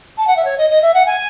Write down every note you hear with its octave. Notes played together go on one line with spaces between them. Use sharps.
A5
F#5
E5
C#5
D#5
D#5
E5
F#5
G#5